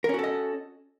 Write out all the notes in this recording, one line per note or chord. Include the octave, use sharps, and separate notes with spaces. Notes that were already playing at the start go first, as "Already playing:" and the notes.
C#4 F#4 A4 A#4 D#5